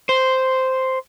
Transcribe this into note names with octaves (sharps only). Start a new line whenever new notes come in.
C5